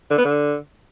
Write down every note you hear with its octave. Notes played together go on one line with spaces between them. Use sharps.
D3
B3
D3